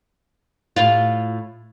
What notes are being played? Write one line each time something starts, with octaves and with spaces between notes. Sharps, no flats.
A2 F4